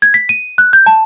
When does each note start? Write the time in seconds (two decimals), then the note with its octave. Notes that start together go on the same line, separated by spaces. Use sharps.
0.02 G#6
0.14 B6
0.29 D#7
0.58 F#6
0.73 G6
0.86 A5